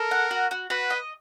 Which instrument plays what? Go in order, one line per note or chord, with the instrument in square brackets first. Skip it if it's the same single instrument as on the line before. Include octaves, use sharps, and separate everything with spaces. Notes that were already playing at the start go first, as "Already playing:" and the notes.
Already playing: [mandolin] A4 [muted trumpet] A#4
[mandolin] F#5
F#4
F#4
[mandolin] F#4 [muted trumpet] B4
[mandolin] D#5